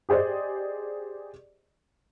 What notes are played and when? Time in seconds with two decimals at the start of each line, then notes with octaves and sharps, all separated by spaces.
0.09 G4 G#4 C5 D5 D#5